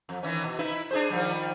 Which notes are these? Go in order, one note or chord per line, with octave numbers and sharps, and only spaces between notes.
F2
D#3 E3 C#4
B2
D#4 E4 B4
D4 G#4 C5
D#3 F3 G3